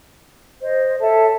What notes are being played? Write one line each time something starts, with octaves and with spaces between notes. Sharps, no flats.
C5 D#5
A4 C#5 E5 A5